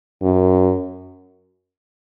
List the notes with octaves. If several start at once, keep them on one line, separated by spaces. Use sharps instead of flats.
F#2